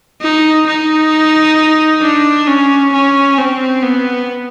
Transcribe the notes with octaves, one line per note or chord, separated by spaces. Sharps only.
D#4
D#4
D4
C#4
C#4
C4
B3